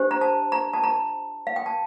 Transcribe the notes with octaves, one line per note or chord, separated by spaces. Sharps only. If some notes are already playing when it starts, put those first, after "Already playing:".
Already playing: D4 G4 C5
A#5
A5
A#5
A5
A#5
F5
G5
A5